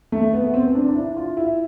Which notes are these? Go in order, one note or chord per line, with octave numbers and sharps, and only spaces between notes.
A3
B3
B3
C4
C4
D4
D4
E4
F4
E4